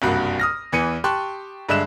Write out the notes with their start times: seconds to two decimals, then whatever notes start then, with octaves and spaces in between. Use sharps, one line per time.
0.02 F#1 C2 G2 F#4
0.40 D#6 F6 A#6
0.72 E2 E3 B4 C#7 D#7
1.04 G4 A5 C6 C#6 F#6
1.69 G2 D3 G#3 E5 F#6 E7